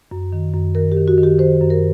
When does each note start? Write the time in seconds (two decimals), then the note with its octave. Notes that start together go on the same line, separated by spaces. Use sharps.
0.11 F#2
0.32 D#3
0.54 F#2
0.75 D#3 A#4
0.92 G4
0.97 D#3
1.08 F#4
1.18 D#3
1.23 G4
1.39 D#3 C5
1.61 F#2
1.70 A#4